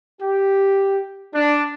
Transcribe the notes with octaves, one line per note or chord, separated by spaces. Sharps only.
G4
D4